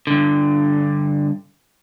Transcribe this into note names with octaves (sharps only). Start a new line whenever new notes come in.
G2 D3